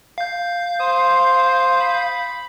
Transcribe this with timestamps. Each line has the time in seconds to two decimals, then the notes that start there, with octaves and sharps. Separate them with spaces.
0.18 F5 G6
0.80 C5 D#6
1.80 B5